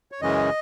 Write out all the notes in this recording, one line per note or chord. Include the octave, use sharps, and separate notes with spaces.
C#5
F#2 C#3 E3 G#3 C#4 D#5